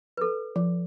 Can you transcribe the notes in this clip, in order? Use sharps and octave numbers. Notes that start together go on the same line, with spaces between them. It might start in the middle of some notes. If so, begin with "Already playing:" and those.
A4 B4
F3